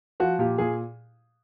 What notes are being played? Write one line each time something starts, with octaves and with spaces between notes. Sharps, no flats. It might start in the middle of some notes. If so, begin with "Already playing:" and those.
F3 F#4
A#2 G4
A#2 G#4